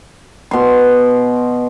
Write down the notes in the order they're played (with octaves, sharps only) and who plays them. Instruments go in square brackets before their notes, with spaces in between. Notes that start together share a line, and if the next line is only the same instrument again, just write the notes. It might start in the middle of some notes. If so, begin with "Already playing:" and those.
[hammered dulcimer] B2 C6